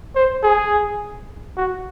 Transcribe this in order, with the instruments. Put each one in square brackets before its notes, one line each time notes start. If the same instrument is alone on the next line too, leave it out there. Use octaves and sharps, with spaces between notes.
[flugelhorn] C5
G#4
F#4